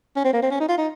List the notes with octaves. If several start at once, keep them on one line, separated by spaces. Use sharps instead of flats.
C#4
C4
A#3
C4
C#4
D#4
F4
D#4